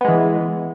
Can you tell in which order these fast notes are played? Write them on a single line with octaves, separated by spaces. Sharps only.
B3 G#3 E3